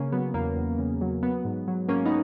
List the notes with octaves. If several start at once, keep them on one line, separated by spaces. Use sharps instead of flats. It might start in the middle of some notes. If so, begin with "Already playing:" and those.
Already playing: C#3 A#3 C#4
F#3 B3
E2 A#3
E2
C#3
F#3
F#3 B3
G#2
F#3
G#2 A#3 C#4
B3 D#4